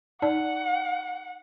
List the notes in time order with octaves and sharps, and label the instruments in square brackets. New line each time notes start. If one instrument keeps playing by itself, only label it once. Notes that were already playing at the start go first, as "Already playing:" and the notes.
[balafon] D#4 D5 A5 [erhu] F#5